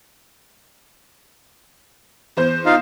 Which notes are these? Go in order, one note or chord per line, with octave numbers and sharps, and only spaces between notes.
E2 C5 G6
D#4 F4 F5